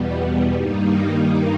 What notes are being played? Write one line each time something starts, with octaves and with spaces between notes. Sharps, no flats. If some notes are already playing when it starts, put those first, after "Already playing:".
Already playing: E2 B2 G3 B3
G2 D#3 G3 A#3 D#4